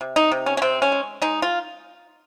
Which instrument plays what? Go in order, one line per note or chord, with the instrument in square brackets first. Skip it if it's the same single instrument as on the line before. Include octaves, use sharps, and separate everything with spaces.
[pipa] C3
D#4
C3
C#4
C#4
C3 C4
C#4
G#3
G#3 D#4
F4